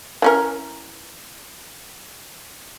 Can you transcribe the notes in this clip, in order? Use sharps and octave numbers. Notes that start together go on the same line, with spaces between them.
E3 C#4 A#4